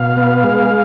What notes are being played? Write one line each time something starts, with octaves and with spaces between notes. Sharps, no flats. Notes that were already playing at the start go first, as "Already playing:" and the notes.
Already playing: B2 F5
B3
G#3